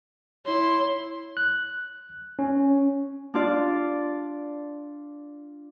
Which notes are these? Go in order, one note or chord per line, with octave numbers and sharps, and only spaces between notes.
E4 C#5 C6
F#6
C#4
D4 F4 D5